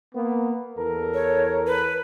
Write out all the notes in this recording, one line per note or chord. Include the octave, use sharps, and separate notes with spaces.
A#3 B3
E2 A4 A#4
C#5
B4